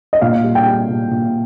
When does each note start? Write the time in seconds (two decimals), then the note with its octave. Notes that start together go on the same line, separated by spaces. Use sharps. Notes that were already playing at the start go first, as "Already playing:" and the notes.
0.13 D#5
0.22 A#2 F5
0.43 G3
0.55 G5
0.66 G3
0.88 A#2
1.11 A#2